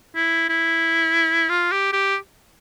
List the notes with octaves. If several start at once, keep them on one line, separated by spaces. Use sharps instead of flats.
E4
E4
F4
G4
G4